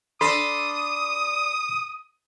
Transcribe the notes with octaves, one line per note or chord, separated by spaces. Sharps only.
D4 A4 B5 C6 D#6